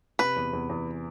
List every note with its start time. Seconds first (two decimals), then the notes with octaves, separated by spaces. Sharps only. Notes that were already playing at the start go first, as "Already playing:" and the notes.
0.19 C3 B4
0.36 E2
0.53 E2
0.69 E2